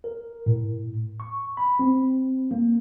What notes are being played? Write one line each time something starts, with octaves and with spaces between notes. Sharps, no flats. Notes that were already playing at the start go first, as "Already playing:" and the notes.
A#4
A2
C#6
B5
C4
A#3